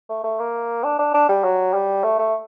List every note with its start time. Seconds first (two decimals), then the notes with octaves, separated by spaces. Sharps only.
0.09 A3
0.24 A3
0.40 A#3
0.84 D4
0.99 D4
1.14 D4
1.29 G3
1.44 F#3
1.74 G3
2.03 A3
2.19 A3